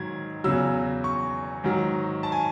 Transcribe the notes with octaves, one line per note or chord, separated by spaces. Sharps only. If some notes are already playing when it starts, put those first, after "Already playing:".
Already playing: G#2 D#3 F#3 G#6
E2 C#3 F#3 E6
C#6
G#2 D#3 F#3
A5
G#5